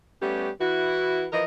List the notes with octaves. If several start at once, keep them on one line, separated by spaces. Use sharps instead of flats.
G3 A3 B3 C#4 G4
E3 E4 F#4
E3 F3 A#4 D#5